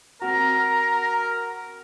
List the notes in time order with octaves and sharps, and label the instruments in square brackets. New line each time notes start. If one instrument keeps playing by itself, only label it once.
[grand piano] C4 F#4 [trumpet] A#4 [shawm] A#5
[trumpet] A#4